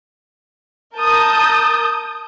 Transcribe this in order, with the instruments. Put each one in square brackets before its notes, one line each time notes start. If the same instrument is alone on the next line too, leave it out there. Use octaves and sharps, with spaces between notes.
[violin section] A#4 A5 D#6 G6